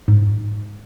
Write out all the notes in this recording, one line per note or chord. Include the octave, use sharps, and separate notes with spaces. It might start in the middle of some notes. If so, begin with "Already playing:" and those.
G#2